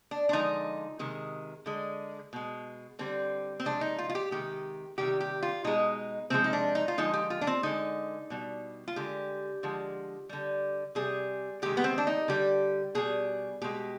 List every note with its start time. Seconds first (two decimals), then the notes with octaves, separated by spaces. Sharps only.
0.11 D4
0.29 D4
0.33 D3 F3 G#3 D#4
0.99 C3 D#3 G#3
1.66 D3 G#3
2.33 B2 G#3
2.99 D3 G3 C4
3.60 C4
3.65 C3 F3 G#3 D4
3.81 D#4
3.98 F4
4.10 F4
4.15 G4
4.31 C3 D#3 G#3 G4
4.98 C3 D#3 G3 G4
5.21 G4
5.42 F4
5.64 B2 G#3 D#4
6.30 C3 F3 G#3 C4
6.44 D#4
6.53 D4
6.75 D#4
6.88 F4
6.98 D3 F3 G#3 D#4
7.14 G4
7.30 F4
7.41 D4
7.47 C4
7.63 D3 G#3 D#4
8.30 B2 G3
8.88 F4
8.96 D3 G#3 G4
9.63 D3 F3 G#3
10.29 D3 G3
10.95 C3 G3 G#4
11.62 C3 D#3 G#3 G4
11.77 B3
11.84 C4
11.98 D4
12.07 D#4
12.28 D3 G3 G4
12.95 B2 G3 G#4
13.62 B2 G#3 G4